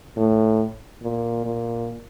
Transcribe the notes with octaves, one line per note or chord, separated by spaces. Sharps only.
A2
A#2
A#2